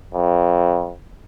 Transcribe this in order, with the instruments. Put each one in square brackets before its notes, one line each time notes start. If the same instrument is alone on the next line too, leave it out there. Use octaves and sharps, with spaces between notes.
[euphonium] F2